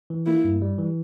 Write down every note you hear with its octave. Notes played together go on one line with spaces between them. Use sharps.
E3
A#3 E4
G2
G3
E3